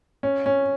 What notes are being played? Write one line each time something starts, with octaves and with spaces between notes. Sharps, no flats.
C#4
C#4